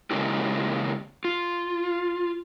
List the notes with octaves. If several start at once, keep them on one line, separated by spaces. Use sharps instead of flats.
C#3 G#3 A#3 C#4 E4 G4
F4